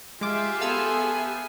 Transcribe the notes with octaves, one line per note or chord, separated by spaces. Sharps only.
G#3 F4 G4 G#4 E5 D6
B3 A4 F5 G#5 E6